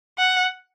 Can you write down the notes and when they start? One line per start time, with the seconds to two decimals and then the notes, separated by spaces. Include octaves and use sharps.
0.19 F#5